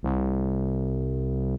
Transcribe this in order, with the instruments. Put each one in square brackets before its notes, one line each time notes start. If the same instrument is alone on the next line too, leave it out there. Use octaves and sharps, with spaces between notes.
[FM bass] C2